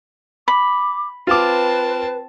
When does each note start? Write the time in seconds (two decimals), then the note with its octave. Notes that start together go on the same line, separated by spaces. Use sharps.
0.48 B5 D6
1.27 C4 F4 B4 A5 D6